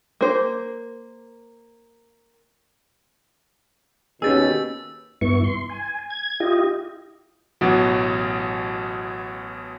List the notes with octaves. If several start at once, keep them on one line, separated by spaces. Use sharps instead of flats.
A#3 C5
D#2 B2 C#4 G4 G#4 E6 A6
G2 B3 E4 C#6
C6
G#5
G#6
E4 F4 G4 D#5
A1 B2 E3 F#3